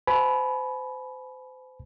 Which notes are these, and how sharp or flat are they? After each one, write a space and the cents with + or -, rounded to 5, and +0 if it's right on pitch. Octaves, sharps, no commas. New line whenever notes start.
C5 -35 G#5 +45 B5 +0